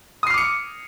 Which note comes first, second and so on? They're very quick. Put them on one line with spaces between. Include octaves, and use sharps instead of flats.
D#6 C7 F6 D6 C#7